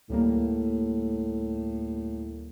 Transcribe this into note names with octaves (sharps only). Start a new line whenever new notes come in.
D2 A2 G3 A#3